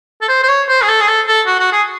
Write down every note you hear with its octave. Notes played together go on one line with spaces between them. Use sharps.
A4
C5
C5
C#5
C5
G#4
A4
G#4
A4
A4
F#4
F#4
G#4